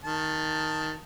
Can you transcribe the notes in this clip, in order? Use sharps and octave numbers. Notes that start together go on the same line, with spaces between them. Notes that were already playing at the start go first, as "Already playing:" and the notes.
D#3 A5